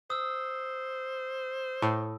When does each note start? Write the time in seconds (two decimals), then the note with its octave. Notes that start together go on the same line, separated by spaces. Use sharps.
0.10 C5 D#6 E6
1.82 A2